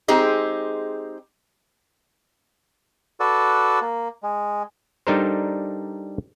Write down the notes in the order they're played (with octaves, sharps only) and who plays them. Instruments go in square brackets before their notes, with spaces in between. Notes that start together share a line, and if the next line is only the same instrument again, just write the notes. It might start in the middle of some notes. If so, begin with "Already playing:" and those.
[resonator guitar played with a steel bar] G#3 C4 D#4 G4 G#4
[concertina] F#4 A4 B4 D5
A#3
G#3
[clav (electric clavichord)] G3 D4 D#4 A4 A#4 C5